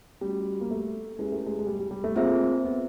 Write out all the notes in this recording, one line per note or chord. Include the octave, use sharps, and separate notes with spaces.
G3 A3 C#4 F#4
A#3
A3
G#3 C#4 E4 G4 B4
A3
G#3
G#3
G3
G3
G3
A3
A#3 C4 F4 G#4 C5 E5
B3